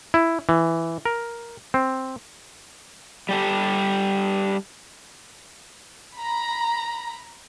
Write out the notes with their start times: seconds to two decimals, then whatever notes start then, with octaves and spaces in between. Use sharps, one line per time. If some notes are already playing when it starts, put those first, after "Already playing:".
0.14 E4
0.49 E3
1.05 A#4
1.74 C4
3.29 G3 G4 A4
6.15 A#5 B5